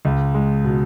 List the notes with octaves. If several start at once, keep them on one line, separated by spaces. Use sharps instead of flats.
C#2
G#3
B2